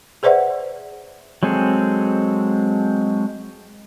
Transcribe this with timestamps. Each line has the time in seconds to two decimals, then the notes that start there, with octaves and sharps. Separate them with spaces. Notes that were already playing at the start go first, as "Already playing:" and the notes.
0.23 G#4 B4 C5 D5 E5 F#5
1.43 F#3 G#3 C4 G#4 A4